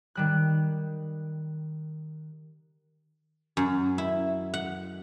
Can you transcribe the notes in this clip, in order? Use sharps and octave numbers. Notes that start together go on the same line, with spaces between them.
D#3 G3 F#6
F#2
E4
F#5